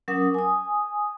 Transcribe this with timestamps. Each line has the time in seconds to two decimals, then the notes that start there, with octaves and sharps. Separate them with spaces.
0.08 F#3 C#4 A#4 F#5 D6 D#6
0.34 G#5 D#6